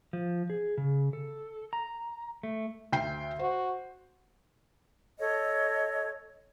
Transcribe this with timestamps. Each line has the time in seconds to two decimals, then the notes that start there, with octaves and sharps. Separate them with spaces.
0.13 F3
0.50 G#4
0.78 C#3
1.13 A4
1.73 A#5
2.43 A3
2.93 D2 G5 C7
3.39 F#4 C5
5.19 A4 C#5 D#5